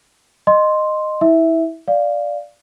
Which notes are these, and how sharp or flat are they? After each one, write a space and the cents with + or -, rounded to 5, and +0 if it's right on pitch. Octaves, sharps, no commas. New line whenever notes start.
D#5 -15 C6 +0
E4 -25 E5 -5
D5 +0 F5 +0